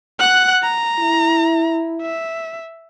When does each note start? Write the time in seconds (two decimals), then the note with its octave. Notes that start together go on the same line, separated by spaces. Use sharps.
0.19 F#5 F#6
0.63 A#5
0.99 E4
2.02 E5